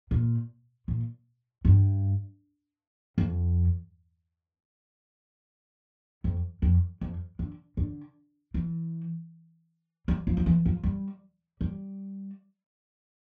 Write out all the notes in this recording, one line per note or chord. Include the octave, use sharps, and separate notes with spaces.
A#2
A#2
G2
F2
F2
F2
F2
D3
D3
E3
G3
F3
F3
E3
F3
G3
G3